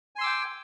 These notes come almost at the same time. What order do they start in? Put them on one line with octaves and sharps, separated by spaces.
G#5 C6 E6 D6 G5